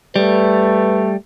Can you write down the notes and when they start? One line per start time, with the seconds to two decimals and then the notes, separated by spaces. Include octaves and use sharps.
0.16 G3 A3 B4